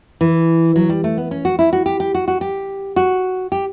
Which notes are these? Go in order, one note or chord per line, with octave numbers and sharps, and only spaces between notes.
E3
F#3
G3
A3
B3
C#4
F#4
E4
F#4
G4
G4
F#4
F#4
G4
F#4
G4